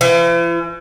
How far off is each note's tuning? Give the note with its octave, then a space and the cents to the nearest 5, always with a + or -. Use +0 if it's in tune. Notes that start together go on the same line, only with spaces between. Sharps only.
E3 +45